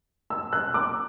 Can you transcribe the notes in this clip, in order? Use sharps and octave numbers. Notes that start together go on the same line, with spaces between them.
E6
F#6
D6